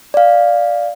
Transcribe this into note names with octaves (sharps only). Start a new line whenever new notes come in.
D5 F5